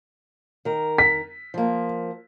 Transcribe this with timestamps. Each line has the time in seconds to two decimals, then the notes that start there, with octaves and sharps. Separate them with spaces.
0.65 D#3 A#4
0.98 B6
1.54 F3 A#3